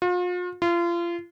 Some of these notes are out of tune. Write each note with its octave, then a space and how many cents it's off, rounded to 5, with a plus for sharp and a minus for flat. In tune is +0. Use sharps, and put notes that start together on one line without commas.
F4 +40
F4 -30